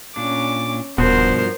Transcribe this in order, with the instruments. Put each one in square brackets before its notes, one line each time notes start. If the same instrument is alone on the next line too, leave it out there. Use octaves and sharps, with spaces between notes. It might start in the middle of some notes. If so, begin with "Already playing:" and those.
[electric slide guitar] A#2 D4 [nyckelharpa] C#4 D6
[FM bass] D#1 [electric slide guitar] G2 F3 F#4 [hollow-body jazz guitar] B2 [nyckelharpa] A#4 C5